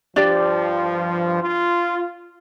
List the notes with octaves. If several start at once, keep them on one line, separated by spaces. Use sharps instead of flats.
G2 F3 D4 G4 D5
F4